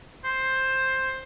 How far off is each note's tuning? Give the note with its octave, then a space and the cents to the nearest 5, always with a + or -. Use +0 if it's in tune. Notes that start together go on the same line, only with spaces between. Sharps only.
C5 +10